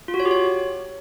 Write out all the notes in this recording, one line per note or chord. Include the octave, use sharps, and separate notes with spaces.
F4
F#4
C#5
G4
C#5